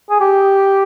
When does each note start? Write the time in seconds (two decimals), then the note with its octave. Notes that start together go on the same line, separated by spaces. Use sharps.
0.10 G#4
0.21 G4